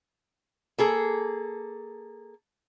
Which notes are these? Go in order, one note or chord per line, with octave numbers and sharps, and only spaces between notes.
A#3 G#4 A4